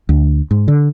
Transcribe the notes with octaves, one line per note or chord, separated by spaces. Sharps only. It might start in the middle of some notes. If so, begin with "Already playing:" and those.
D2
G#2
D3